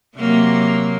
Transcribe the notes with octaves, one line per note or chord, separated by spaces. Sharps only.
C3 F#3 A#3